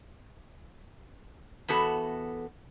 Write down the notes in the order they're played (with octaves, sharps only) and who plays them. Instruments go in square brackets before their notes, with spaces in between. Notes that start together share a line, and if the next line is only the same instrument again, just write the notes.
[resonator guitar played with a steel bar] E2 B3 F#4 A4